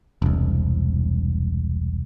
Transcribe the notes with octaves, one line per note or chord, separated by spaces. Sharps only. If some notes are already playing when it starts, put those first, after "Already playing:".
E1 C2